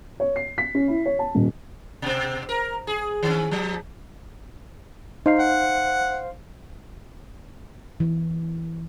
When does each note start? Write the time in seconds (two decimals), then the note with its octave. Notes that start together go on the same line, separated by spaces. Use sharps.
0.20 C#5
0.36 C7
0.58 B6
0.75 C#4
0.88 E4
1.06 C#5
1.19 A5
1.35 D#1
2.02 B2 C4
2.49 A#4
2.87 G#4
3.23 D#3 C#4
3.51 F3
5.26 D#4 C5 F5 C7
5.40 F#5
8.00 E3